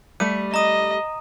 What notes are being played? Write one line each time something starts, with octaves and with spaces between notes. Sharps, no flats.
G3 A3 D#7
D#5 A#5 D#6